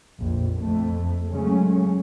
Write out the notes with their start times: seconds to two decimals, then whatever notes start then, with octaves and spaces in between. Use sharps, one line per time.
0.20 A#1 F2
0.58 F2 A3
1.29 C#3 F#3 G#3 A3 C#4